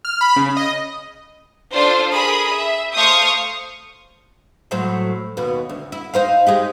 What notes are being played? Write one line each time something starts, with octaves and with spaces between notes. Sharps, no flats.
F6
B5
C#3
D#5
D4 F4 A4 C5
G#4 A#4 B5 D#6
E5
A3 C5 F5 C#6 D#6 G6
A2 F#3 C5
D#2 B2
D2
E4
D#4 C5 F5
G#3 D#4 G4